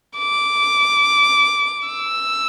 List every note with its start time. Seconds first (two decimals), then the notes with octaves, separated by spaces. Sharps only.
0.18 D6
1.88 E6